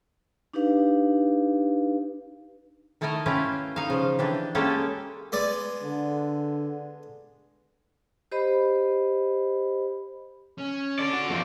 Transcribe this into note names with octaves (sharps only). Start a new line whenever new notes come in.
D4 D#4 G4 B4 F5
D#3 A3 E4 A4 A#4 D#5
C#4 E4 F4 G4 B4
D#4 F5
C#3 F3
E3 D4 G4
G#3 A#3 C#4 G4 A4 B4
G#3 B3 D5
D3
G4 C5 D#5 B5
C#4
A4 D5
F#4
E2 F3 G#3 F4